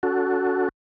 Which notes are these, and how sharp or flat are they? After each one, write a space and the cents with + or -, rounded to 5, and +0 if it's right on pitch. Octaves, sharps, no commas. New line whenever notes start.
C#4 +40 F#4 +0 A4 +0